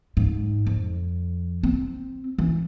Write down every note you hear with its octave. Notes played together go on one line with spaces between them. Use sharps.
G#2
F2
C4
E3